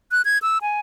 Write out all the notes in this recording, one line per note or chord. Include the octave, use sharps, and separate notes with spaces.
F#6
G#6
E6
G#5